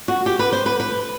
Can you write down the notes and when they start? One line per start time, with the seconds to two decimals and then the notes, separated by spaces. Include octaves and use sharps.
0.08 F#4
0.26 G4
0.39 B4
0.53 C5
0.66 B4
0.80 B4